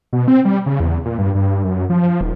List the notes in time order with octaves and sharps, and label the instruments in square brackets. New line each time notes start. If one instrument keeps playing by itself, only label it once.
[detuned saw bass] B2
C4
G3
C#3
E2
A#2
G2
G2
F#2
F3
D#1